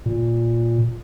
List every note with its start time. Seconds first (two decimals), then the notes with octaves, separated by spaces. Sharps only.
0.06 A#2